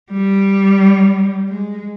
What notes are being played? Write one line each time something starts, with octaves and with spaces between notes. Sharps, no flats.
G3
G#3